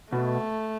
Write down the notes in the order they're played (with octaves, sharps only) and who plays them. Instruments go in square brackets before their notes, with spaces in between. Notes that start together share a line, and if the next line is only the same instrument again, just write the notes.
[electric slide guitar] B2 [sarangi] A3